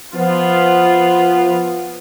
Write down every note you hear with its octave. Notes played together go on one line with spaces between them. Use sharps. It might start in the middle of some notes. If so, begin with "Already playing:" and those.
F3 B3 F4